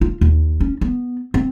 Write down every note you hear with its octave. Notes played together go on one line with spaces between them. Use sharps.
F4
D#2
C#4
B3
C4